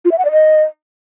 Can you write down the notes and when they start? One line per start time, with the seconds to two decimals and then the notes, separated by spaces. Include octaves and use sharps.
0.05 F4
0.12 E5
0.18 F#5
0.25 D5
0.32 D#5